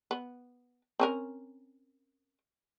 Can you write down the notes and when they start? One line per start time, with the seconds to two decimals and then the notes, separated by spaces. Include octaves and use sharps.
0.11 B3
0.99 C4 C#4 A#4